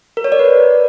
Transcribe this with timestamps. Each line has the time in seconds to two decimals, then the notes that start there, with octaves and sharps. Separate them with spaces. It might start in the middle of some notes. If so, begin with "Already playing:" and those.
0.17 A#4
0.24 C#5
0.32 D5
0.39 B4